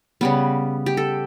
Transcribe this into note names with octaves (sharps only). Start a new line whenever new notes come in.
C#3 G3 B3
G4
A4